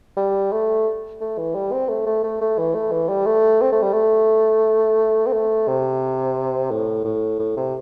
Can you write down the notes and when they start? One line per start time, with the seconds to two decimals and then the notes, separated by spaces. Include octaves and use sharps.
0.17 G3
0.52 A3
1.21 A3
1.38 E3
1.55 G3
1.72 C4
1.89 A3
2.06 A3
2.23 A3
2.41 A3
2.58 E3
2.75 A3
2.92 E3
3.09 G3
3.26 A3
3.61 C4
3.72 A3
3.82 G3
3.93 A3
5.27 C4
5.33 A3
5.68 C3
6.71 A2
7.05 A2
7.39 A2
7.57 C3